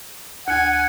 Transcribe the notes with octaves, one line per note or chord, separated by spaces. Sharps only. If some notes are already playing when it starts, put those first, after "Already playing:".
D2 F#5 G#5